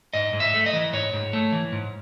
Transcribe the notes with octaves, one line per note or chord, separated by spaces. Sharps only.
G#2 D#5
G#2
E5
A3
D#5
E3
G#2 C#5
G#2
A3
E3
G#2